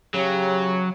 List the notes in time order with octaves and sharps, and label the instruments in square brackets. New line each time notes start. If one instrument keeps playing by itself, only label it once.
[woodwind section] C#3 [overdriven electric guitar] F#3 [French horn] G4